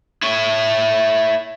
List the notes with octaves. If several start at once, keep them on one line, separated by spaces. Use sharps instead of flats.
E4 C#5